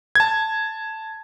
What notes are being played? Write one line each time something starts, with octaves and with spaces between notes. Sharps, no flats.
A5 G#6